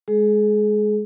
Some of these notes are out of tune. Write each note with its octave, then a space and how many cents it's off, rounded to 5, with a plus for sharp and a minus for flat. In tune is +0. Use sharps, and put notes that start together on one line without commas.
G#3 +0 G#4 +30